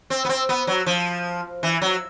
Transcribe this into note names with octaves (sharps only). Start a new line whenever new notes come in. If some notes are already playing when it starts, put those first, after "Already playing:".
C4
B3
C4
B3
F#3
F3
E3
F#3